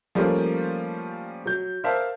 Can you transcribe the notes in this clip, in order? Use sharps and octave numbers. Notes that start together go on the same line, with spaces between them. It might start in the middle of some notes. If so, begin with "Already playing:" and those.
F3 G3 A3 A#3 C#4 F4
F#3 G6
A#4 C5 D5 E5 F5 A5